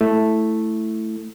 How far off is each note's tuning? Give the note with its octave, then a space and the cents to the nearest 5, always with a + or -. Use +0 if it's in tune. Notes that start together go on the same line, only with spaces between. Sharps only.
A3 +0 E4 +0